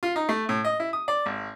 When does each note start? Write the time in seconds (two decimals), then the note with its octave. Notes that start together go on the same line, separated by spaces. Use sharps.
0.03 F4
0.16 D#4
0.29 A3
0.49 A2
0.65 D#5
0.80 E4
0.93 D#6
1.08 D5
1.26 G#1